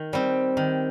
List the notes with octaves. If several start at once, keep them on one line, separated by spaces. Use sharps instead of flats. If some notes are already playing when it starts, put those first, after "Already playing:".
Already playing: D#3
G3 C4
D#3